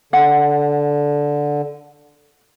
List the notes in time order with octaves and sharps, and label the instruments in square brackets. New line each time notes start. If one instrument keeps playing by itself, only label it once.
[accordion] D3 [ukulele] F#5